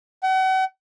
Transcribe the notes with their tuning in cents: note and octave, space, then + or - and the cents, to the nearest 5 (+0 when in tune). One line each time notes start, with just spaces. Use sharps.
F#5 +40